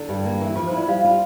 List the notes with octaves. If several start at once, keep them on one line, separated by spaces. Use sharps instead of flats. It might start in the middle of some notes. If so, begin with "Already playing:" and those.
Already playing: D3 E4
G2
A#3
E3
F3 F4
E4 C5
D5
G3 F5
F4